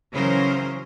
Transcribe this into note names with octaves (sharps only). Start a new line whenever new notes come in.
C#3 E3 F#3 C#4 A#4 C5